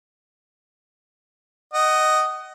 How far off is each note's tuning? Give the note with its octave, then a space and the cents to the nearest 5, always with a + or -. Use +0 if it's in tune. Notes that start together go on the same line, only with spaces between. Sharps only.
D#5 -5 F#5 +25